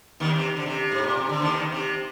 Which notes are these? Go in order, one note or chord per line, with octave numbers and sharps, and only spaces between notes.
D#2 D#3
C3
D3
C3
G#2
A#2
C3
D3
D#2 D#3
C3